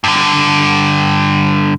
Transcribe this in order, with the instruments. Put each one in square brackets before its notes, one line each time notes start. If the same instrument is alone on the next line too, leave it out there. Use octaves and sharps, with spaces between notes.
[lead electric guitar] G2 D3